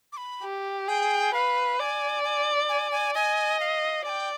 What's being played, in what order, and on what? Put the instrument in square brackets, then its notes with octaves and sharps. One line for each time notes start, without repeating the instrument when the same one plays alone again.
[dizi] D6
B5
[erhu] G4
[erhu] G#4 [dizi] G5
[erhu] B4 [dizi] F5
[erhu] D5 [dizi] G#5
[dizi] G#5
G#5
G#5
[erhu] D#5 [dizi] G#5
[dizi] F5
[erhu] D5 [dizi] G#5
[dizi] G5